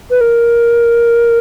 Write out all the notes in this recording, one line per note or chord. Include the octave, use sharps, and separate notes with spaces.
B4
A#4